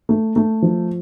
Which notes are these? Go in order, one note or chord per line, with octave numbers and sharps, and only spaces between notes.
A3
A3
F3